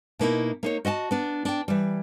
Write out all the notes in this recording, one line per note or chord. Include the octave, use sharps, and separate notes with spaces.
B2 A#3 D#4 E4
A#3 D#4 C#5
F#4 D#5 G5 A5
B3 D4
D4 G5
E3 G3